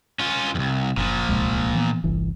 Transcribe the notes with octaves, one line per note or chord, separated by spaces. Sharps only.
C#4 F4
C2 F2
F#1 A#2 F3
D1 C2 G#3
E3 B3
G1 C2 E3